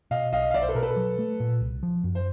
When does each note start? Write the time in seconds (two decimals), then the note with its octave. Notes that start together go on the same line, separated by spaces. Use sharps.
0.11 B2 D#5 F5
0.32 B1 D#5 F5
0.51 F5
0.54 B1 D5 E5
0.62 C5
0.68 A4 B4
0.75 B2 A#4
0.83 A4 B4
0.97 F#3
1.19 A3
1.40 A#2
1.61 C2
1.83 F3
2.04 F#2
2.15 C5